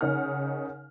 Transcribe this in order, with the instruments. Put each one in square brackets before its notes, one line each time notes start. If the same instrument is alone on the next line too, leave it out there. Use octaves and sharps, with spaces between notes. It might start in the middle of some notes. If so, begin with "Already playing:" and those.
[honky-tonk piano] C#3 D#4 A#4 F#5 F6